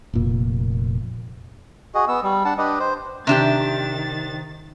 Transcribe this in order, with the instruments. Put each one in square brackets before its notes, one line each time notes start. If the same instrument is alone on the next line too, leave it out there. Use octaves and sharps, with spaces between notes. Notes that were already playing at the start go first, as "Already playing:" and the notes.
[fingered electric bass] F1 F2 A#2 A#3
[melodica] F#4 G#4 D#5
B3 E6
G3
D4 F#5 A5
D4 G4 B4 D#5
C5
[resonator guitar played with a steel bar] C3 D4 G4 [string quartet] D#3 A6